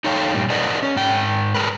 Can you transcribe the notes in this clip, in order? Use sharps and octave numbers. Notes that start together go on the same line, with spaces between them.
D#4 A4 C#5 F5 G5
G2 A#2 G3
G#4 A#4 B4 D5 D#5 F#5
C#4
G#2 G5
G#4 A#4 B4